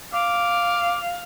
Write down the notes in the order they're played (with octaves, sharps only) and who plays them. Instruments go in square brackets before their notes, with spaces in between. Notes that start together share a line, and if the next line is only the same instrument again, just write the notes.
[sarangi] F5 [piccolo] D6